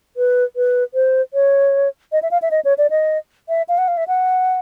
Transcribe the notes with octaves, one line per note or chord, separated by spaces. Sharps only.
B4
B4
C5
C#5
D#5
E5
F5
E5
D#5
C#5
D5
D#5
E5
F5
F#5
F5
E5
F#5